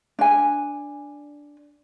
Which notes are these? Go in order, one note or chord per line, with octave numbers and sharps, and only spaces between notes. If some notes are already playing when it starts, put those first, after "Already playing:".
D4 G#5